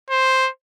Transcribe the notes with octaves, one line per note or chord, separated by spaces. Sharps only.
C5